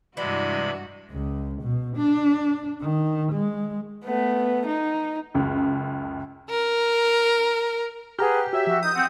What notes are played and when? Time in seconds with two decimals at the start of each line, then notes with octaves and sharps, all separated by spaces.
0.17 G2 C3 E3 G#3 D4 E4 F#4 B5
1.11 C#2
1.62 B2
1.97 D4
2.81 D#3
3.32 G#3
4.05 A3 B3
4.66 D#4
5.34 C#2 F#2
6.50 A#4
8.19 G4 G#4 B4 F#5 A#5 F6
8.53 F#4 C#5 E5
8.67 F3 F#4
8.83 D#4 D#6 G6
8.96 C4 F#5 G6